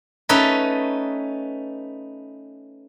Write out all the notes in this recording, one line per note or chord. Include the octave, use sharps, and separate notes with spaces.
A3 C#4 D#4 A4 B4